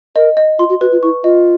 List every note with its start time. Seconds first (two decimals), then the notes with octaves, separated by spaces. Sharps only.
0.16 A#4 D#5
0.37 D#5
0.59 F4 C6
0.69 F#4
0.81 F#4 B4
0.92 F4
1.03 E4 C#6
1.24 F4 D#5